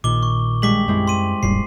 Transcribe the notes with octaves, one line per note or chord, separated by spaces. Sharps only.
A#1 A#2 D#3 D6 G7
C#6
G2 G#3 D6 B6 F#7
F#2 G#3 C4 E4
C6 D#7
D1 A#1 F#2 G3 C7